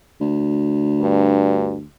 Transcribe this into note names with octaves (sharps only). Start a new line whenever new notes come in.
D2
G2